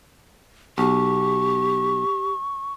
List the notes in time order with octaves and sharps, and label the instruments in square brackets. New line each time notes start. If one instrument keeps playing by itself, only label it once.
[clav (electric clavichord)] B1 [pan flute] G4 [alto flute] C#6